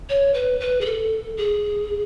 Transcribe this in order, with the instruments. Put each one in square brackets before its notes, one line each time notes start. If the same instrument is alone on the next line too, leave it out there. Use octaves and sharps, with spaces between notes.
[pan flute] C#5
B4
B4
G#4
A4
G#4